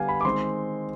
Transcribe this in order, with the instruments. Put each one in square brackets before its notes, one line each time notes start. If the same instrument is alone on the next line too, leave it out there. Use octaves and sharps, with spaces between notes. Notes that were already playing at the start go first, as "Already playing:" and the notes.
Already playing: [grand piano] D3 G3 B3 F5 G#5
B5
D6
D#3 G#3 C4 C6